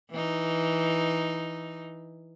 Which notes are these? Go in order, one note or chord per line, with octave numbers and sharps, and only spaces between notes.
E3 D#4